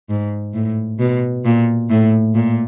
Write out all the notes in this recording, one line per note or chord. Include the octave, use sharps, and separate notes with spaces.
G#2
A2
B2
A#2
A2
A#2